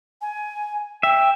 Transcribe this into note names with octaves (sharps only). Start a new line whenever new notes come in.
G#5
E5 G5